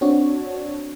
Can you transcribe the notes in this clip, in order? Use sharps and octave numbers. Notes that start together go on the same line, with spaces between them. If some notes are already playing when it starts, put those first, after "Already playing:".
C4 D4 F#4 C#5 D5